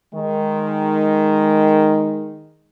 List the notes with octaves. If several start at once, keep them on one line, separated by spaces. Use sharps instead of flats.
D#3 G#3